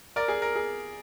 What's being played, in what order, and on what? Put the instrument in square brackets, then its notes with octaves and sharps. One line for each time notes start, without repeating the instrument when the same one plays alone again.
[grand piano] A#4 D5
G#4
A#4
G#4